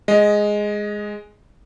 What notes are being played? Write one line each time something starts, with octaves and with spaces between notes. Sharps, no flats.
G#3 D#5